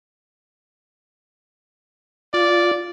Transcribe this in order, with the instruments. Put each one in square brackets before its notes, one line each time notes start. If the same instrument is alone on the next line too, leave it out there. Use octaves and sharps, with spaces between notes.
[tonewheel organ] F4 [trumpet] D5